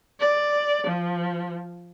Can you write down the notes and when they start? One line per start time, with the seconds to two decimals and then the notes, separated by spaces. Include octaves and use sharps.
0.19 D5
0.87 F3